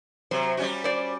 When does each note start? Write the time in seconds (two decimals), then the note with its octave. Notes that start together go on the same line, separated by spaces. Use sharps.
0.31 C3 F#3 C5
0.57 G3 C#4 F#4
0.84 C5 D5